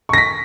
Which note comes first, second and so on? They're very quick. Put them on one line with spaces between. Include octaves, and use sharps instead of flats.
C#6 A#6 B6